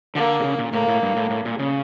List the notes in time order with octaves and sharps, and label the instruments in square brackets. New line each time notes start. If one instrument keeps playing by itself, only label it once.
[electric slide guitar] D3 [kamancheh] A#3
[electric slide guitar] A#2
C#3
A#2
[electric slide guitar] A2 [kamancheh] A#3
[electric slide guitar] A2
G2
A2
A2
A#2
C#3